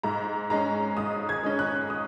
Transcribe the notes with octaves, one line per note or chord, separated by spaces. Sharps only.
G#2 A#5
G#3 C#4 A#5
G#2 D#6
G#6
G#3 C#4
F#6
D#6